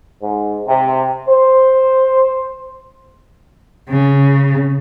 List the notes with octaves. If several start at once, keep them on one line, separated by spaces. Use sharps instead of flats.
G#2
C3
C5
C#3